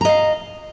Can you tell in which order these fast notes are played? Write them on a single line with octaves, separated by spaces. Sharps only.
A#5 D#5 F5